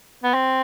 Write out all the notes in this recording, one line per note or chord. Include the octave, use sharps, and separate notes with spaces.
B3
C4